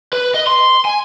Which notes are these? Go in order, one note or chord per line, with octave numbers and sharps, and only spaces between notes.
B4
D#5
C6
G#5